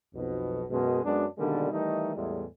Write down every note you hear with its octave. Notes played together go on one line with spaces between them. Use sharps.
B1 F2 B2
F#2 B2 G#3
F#2 F#3 G#3 B3 D4
B2 D3 D#3 G3 G#3 A#3
D#3 E3 G3 A3 D#4
E2 A2 G3 G#3